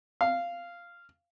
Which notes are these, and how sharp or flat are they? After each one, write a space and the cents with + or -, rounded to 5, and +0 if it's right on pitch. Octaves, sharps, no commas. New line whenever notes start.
F5 -10